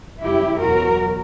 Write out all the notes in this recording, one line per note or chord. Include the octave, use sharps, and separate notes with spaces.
F#2 C#3 G3 E4 G4
E2 B2 F#3 F#4 A#4